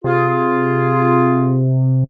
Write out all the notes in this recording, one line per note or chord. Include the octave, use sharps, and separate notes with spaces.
C3 F4 G#4